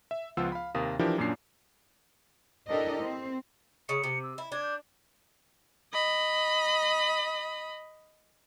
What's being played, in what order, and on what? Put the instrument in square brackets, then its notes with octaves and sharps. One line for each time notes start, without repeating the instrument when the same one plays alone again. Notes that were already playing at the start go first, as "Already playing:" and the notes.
[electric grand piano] E5
C#2 F3 B3 F4 F#5 E6
F5 B5
D#2 C3 A#4 F5 D#6
E3 F3 D4 E4 G4 A#4
F#2 A#2 A#3 C#4 D4 C7
[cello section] D4 E4 G4 A4 A#4 D#5
C4
[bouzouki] C#3 [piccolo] C#7
[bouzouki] C3
[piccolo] E6
[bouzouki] E4
[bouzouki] D4 [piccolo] G#6
[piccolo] G6
[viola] D#5 B5